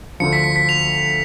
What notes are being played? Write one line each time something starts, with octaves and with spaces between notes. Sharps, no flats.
D2 D3 F3 C#7
B6
C#7
B6
F7